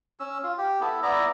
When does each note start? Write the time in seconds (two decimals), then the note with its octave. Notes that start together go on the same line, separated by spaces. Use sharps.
0.20 C#4 E6
0.44 F4
0.58 G4
0.81 B3 E4 A4
1.03 B3 E4 D5 A#5